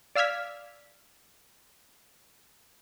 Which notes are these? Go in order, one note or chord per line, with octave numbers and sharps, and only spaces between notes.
D5 F5 E6 F6 G#6 B6